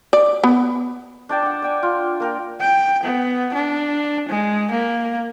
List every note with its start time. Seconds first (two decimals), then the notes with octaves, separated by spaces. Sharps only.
0.13 D5
0.44 B3
1.29 D4 D5 G5 A5
1.42 D4 F#5
1.62 D5 G5 G#5
1.83 F4
2.20 A#3 A#4 G5
2.60 G5
3.03 B3
3.54 D4
4.29 G#3
4.71 A#3